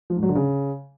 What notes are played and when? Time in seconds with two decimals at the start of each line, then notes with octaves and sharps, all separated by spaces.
0.10 F3
0.16 G#2
0.23 F#3
0.29 D3
0.35 C#3